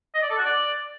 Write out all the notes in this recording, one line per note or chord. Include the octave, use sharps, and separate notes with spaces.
D#5
D5
A4
F#4
D5